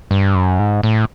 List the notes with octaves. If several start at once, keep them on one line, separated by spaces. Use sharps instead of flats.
G2
F#2
G#2
A2